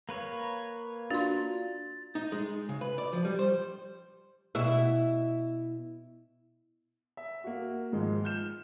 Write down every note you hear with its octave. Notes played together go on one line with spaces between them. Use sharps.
A#3 B4 C#5
D4 F4 F#4 C6 A6
D#4
G#3
C#3
B4
D5
F3
G3
C5
B2 E4 E5
E5
A#3 F#4
G#2 D#3 F3 G#3
F6 G6 E7